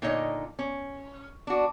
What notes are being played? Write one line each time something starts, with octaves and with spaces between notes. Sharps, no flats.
A#2 D3 D#4 C#5 D#5
C#4
D4 F#4